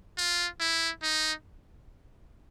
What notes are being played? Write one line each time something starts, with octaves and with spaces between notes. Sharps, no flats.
F4
E4
D#4